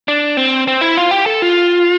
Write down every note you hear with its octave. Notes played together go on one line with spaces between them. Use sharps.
D4
C4
C4
E4
F4
G4
A4
F4